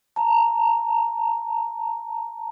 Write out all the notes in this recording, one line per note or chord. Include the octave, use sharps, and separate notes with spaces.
A5 A#5